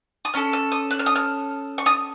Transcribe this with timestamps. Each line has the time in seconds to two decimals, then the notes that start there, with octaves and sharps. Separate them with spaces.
0.25 D#6
0.34 C#4 A4 F6
0.53 F6
0.72 D#6
0.91 F#6
0.99 F6
1.06 D#6
1.16 F6
1.78 C#6
1.86 D#6